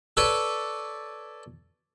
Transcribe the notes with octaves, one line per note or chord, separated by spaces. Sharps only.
A4 B4 C#5 D5